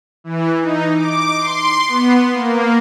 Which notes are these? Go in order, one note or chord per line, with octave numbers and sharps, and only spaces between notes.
E3
D#4
D6
C6
B3
A#3